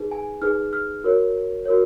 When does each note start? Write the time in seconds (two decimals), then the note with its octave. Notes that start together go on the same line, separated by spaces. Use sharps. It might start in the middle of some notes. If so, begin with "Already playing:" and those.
Already playing: D#4 G#4 B4
0.11 G#5
0.42 D#4 G#4 B4 F6
0.73 F6
1.04 F#4 A#4 C#5
1.65 F#4 A#4 C#5